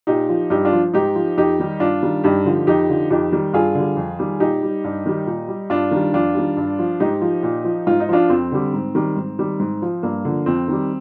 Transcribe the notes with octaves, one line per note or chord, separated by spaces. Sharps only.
A#2 D#4 G4
F3
G2 D#4 G4
D4 F4
F3
G#2 D#4 G4
F3
F2 D#4 G4
D#3 G3
G2 D4 F4
D#3 G3
G2 D#4 G4
D3 F3
F2 D#4 G4
D3 F3
F2 D#4 G4
D#3 G3
G2 F4 G#4
D3
G3
F2
D#3 G3
A#2 D#4 G4
G3
G2
D#3 G3
A#2
G3
G2 D4 F4
D#3 G3
F2 D4 F4
D#3 G3
G2
F3
G#2 D#4 G4
F3
A#2
F3
G#2 F4
D#4
F3 D4 F4
F2 C4
D3 G3
G#2
D#3 G3
G#2
D#3 G3
G#2
F3
G2 A#3
D3 F3
F2 C4
D#3 G3